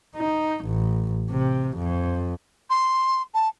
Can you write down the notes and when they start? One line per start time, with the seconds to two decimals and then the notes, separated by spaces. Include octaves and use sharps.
0.16 D#4
0.66 A1
1.30 C3
1.78 F2
2.70 C6
3.34 A5